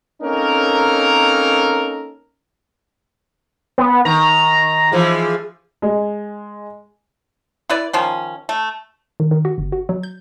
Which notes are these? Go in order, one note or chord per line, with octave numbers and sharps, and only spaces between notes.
A#3 C4 C#4 D#4 A4 A#4
B3
D#3 A#5
E3 F3 G#3
G#3
E4 B4 D5
D#3 F3 C#4
A3
D#3
D#3
F#4
G1
F#4
F#3
G6